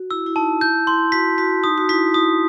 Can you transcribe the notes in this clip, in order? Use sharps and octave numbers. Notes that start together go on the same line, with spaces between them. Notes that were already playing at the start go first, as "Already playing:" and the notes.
Already playing: F#4
E4 E6
E4
D#4 A5
E4 G6
E4 C6
F#4 B6
F#4 B6
D#4 D#6
F#4
E4 B6
E4 D#6